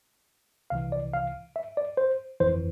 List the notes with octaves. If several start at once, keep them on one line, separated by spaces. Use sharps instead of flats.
C2 C3 E3 F5
D5
F5
E5
D5
C5
G1 F2 E3 C5